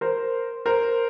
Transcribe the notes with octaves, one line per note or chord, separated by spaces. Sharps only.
A#4 C5
A#4 C5